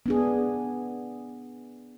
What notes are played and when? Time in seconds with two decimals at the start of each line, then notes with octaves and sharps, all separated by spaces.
0.06 B3 D4 G#4